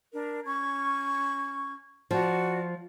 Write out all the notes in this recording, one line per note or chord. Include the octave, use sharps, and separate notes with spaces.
D4 A#4
C#4 C#6 G#6
F3 F#4 D5